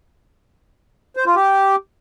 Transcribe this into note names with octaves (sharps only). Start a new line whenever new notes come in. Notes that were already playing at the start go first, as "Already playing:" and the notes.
C5
F4
G4